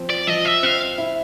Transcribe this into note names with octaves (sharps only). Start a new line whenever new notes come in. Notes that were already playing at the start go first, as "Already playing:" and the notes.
Already playing: F3 C4
D5
F3 D#5
E5
C4 F5
E4